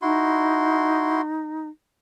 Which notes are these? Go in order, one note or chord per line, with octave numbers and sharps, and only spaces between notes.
D#4 E4 F#4 C6